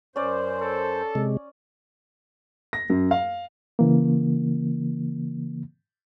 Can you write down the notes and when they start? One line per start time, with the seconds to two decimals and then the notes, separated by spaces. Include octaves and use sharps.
0.16 F#2 C#4 C5 D5
0.61 A4
1.15 C3 G#3
2.73 A#6
2.90 F#2
3.11 F5
3.79 C#3 E3 A#3